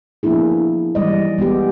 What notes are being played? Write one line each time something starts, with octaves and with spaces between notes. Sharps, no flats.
F3 A#3 B3 D4 E4 G#4
E3 G3 G#3 D5 D#5
G#3 B3 G4